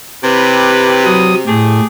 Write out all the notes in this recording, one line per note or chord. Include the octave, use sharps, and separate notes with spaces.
C3 E4 G4 B4
F#3 D#6
A2 A3 G4 G#4